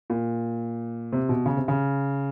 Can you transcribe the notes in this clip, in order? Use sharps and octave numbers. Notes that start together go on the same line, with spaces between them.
A#2
C3
B2
C#3
C3
C#3